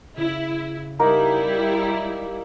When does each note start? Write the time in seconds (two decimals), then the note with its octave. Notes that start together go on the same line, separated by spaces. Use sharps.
0.17 C#3 E4
0.99 G3 A#3 D#4 E4 A#4